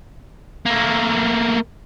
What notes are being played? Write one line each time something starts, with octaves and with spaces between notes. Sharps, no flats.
A3 A#3